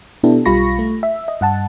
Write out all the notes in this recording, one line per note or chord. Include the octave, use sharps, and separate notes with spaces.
B2 B3 D4 E4 G4 A4
B1 G3 F4 B5 C#6 A#6
A3
E5
D#5
G2 F#5 A5